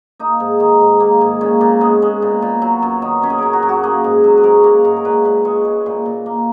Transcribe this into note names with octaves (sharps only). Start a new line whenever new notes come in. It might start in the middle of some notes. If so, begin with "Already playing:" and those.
A#3 D#4
G#2
D#3
G#2
A#3
G#2
A#2 C#4
A#2 A#3
G#3 B3
G#3
A#2
A#2
F#3
F#2
D#3
F#2 C#4
G#4
F#3 A#4
F#4
F#2
F#4
A#3 G#4
G#2
F#3
B4
G#2 A#4
A#3 A#4
G#2 C#5
A#4
A#2 B4
A#2 B4
G#3 C#5
G#3
A#2
A#2
A#3